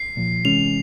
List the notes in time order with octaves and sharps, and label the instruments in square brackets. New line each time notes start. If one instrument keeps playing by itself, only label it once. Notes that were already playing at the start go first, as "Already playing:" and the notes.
Already playing: [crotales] C7
[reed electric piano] C2 A#2 F3
[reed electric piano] C3 E3 G#3 C#4 [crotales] F7